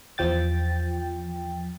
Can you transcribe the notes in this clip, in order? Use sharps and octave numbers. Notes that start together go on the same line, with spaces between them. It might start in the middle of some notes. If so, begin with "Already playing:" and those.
E2 F3 G5 A6